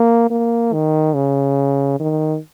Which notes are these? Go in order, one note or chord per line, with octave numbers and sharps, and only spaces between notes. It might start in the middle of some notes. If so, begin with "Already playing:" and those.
Already playing: A#3
A#3
D#3
C#3
D#3